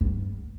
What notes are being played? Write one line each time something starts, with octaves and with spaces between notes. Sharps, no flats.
E2
G2